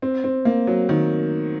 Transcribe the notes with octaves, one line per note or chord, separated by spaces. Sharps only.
C4
C4
A#3
F#3
D#3